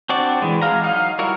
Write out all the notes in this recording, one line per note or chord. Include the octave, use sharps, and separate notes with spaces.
C4 D4 F#4 D5
E3 G#3
G#3 F5 A#5
F#3 D#4 F5
G3 E4 F#4 A#4 C#5